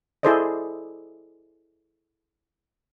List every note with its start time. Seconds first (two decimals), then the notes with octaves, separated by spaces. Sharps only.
0.23 E4 G#4 A4 C5 D5 D#5